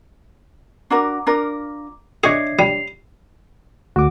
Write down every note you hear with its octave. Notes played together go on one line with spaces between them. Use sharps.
D4 F#4 A#4 A#5 D6
D4 F4 A#4
D4 G#4 C#5 D#5 E5 G#6 C7
G3 C7 F7
D2 F#4 D6